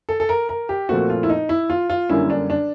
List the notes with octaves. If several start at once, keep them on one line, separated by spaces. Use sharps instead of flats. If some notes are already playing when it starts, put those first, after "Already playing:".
A4
A4
A#4
A#4
G4
A#2 F3 A3 C4 F#4
F4
E4
D#4
E4
F4
F4
F#2 D3 G3 A#3 C#4 E4
D4
D4